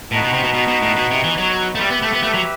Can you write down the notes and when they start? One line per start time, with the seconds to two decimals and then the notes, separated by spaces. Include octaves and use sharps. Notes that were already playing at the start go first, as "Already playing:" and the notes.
0.12 A2 B3 D#4 F#4 B4
0.23 B2
0.33 C3
0.43 B2
0.54 B2
0.68 B2
0.82 A2
0.96 B2
1.11 C3
1.24 E3
1.38 F#3
1.75 A3
1.80 G3 G4 B4 E5
1.91 B3
2.02 A3
2.12 B3
2.23 A3
2.34 F#3